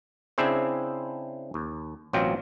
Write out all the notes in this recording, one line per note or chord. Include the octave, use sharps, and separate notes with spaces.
C#3 C4 D4 E4 G#4 C5
D#2
A1 B2 F#3 C4 F4 G5